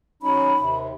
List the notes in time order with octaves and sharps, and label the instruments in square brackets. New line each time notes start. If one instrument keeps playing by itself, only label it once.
[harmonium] F#3 C#4 D#4 [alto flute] B5
[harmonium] D#2 C3